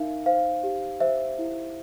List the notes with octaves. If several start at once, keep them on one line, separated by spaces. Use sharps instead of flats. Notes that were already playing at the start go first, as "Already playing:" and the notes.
Already playing: D#4 A#4 E5 F5
C5 F5
G4
C5 E5
E4